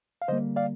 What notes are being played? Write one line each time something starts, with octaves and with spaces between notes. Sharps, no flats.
F5
D3 G3 A#3 C5 D#5
D5 F5